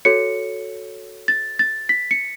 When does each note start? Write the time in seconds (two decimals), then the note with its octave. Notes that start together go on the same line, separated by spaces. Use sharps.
0.05 F#4 A4 C#5 C#7
1.28 A6
1.59 A6
1.89 B6
2.11 C#7